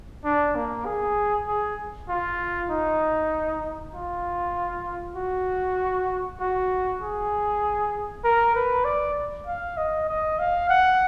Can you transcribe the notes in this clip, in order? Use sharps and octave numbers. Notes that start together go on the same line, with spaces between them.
D4
A#3
G#4
G#4
F4
D#4
F4
F#4
F#4
G#4
A#4
B4
D5
F5
D#5
D#5
F5
F#5